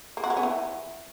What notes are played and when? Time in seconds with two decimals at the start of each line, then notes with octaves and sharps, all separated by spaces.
0.17 A#3
0.24 F#4
0.30 C#4
0.37 B3
0.43 E3